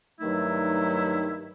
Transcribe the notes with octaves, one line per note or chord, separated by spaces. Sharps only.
G2 D#3 F#3 A3 D#4 E4